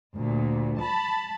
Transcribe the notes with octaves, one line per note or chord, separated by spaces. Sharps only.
D2 A#2
A5 B5